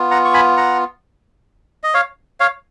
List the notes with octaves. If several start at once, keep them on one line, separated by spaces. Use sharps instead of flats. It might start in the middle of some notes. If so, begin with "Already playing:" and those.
Already playing: B3 F4
F#5 A#5
C#6
G#5 B5
F#5 A#5
D#5
C#5 F5
C#5 F5